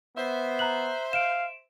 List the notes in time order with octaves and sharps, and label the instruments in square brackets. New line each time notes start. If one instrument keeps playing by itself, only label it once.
[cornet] B3 [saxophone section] C5 E5
[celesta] A#5 F#6 F#7
[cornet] F5 [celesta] D7 E7